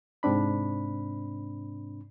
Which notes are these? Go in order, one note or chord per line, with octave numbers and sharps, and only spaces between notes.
G#2 C3 C4 D4 B5